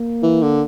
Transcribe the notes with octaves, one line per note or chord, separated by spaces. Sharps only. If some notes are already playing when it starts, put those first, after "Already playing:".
Already playing: A#3
E3
D3